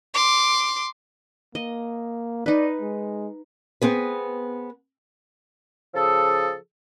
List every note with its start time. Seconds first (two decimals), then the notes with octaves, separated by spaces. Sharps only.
0.14 C6 D6
1.55 A#3 D#5
2.46 D#4 B4 D5
2.81 G#3
3.82 B3 C4 G#4 B4
5.95 C#3 F3 G#4 A4